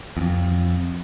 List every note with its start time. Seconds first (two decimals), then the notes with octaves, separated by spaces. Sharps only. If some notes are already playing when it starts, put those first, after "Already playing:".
0.17 E2
0.21 F2